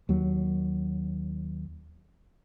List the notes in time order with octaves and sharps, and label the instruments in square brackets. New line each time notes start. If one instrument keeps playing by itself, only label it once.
[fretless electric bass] D#2 F#3